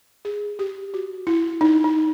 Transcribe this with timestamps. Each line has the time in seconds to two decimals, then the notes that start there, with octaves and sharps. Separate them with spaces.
0.25 G#4
0.59 G4
0.94 F#4
1.27 E4
1.61 D#4
1.84 D#4